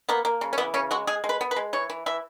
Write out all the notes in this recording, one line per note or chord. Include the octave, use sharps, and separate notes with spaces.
A#3 B3
A#3
C#3
C#4
E3 B3
C#3 C#4
G#3 F#4
G#3 G#4
G#3
B4
B3
B4
G#3
E3 C#5
E3
E3 E5